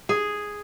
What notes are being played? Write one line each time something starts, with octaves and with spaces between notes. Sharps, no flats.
G#4